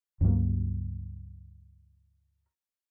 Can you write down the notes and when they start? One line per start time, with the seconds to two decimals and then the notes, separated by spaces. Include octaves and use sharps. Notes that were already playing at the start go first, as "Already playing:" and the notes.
0.21 C#2 G2 F#3 A#3